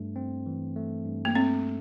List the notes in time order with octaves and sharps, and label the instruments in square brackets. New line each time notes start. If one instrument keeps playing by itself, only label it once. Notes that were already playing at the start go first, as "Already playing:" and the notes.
Already playing: [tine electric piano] G2 A3
C4
E3
A3
G2
[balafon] A#3
[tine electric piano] A3 [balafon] C4